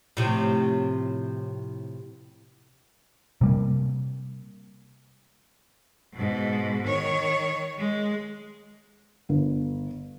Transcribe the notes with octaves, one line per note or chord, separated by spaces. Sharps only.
A2 C3 F3
C3 G3 A#3
G#2 B2
D#3 C#5
G#3
G1